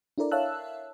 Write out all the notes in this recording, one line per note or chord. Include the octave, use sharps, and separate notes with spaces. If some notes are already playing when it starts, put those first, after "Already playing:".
D4 E4 A4 A#4 D5
C#5 E5 F5 A5 E6 F#6